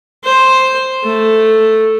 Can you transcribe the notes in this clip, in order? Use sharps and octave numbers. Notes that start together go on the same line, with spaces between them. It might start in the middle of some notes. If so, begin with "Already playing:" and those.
C5
A3